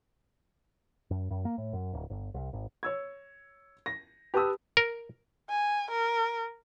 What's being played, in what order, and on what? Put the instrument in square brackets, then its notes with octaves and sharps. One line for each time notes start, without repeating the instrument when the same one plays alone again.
[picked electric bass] F#2
F#2
A#3
A2
F#2
D1
G1
C2
G#1
[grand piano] C#5 E6 G#6
A#6
G4 B4 A5 B5 D#6 E6
[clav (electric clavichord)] A#4
[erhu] G#5
A#4